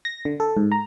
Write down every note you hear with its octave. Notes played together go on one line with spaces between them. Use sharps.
A#6
D3
A4
G#2
A#5